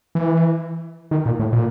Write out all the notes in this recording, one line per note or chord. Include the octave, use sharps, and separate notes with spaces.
E3
D#3
A#2
A2
A#2